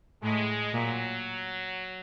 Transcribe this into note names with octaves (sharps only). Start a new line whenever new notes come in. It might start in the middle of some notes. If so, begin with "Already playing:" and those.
A2 G#3
A#2 F#3